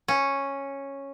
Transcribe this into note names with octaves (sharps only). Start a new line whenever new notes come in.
C#4